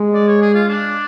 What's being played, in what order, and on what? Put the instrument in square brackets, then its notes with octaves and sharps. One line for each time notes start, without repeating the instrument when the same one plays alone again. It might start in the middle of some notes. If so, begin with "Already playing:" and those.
Already playing: [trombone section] G#3
[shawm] D5
C#5
G#4
F4
D4